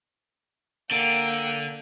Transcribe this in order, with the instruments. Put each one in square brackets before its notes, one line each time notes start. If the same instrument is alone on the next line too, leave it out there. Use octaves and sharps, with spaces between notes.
[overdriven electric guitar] D3 [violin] A#3 G5